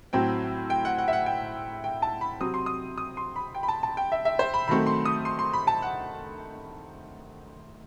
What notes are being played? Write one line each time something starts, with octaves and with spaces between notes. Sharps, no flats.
A2 F#3 C4 G5
G5
F#5
F#5
E5
F#5
G5
G5
A5
B5
C3 F#3 C4 D#6
C6
D#6
D#6
C6
B5
G5
B5
A5
A5
G5
E5
E5
C5
B5
D#3 F#3 A3 C4 B5
C6
D#6
C6
C6
B5
A5
F#5